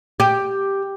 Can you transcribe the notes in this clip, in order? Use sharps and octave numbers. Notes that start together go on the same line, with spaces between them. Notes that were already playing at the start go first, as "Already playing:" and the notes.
G4